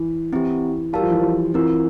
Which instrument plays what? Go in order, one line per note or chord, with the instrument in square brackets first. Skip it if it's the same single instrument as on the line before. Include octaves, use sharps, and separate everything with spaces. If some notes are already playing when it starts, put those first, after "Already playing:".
Already playing: [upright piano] E3
[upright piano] E3 [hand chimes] C4 E4 G4
[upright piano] G3 [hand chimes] G4 A#4 F5 A5
[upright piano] F3
E3
F3
[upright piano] E3 [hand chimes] C4 F4 A#4